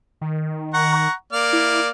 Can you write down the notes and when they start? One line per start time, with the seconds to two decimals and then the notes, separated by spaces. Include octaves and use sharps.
0.21 D#3
0.74 F#5 A#5 C#6
1.33 A#3 D5 F6
1.53 E4